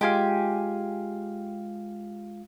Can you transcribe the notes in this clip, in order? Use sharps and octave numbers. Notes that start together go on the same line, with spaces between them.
G#3 F4 G4 F5 G#5 D6